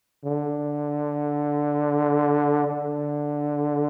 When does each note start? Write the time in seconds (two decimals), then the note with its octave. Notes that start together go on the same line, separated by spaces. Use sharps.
0.25 D3
2.67 D3